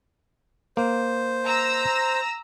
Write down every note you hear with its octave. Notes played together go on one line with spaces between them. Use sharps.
A#3 C5
A#5 E6 A#6